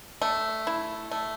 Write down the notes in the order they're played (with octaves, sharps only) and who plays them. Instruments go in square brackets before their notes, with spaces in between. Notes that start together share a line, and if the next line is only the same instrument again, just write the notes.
[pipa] A3
E4
A3